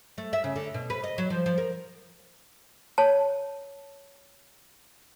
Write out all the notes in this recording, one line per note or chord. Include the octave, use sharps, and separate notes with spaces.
A3
E5
C#3
D3
B2
B4
D#5
F#3
F3
F3
A#4
C#5 A5